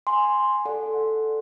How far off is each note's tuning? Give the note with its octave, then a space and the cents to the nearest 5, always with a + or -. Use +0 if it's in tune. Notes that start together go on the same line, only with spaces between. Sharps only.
G#5 +0 C6 +0
A4 -5 D5 +0 F#5 +0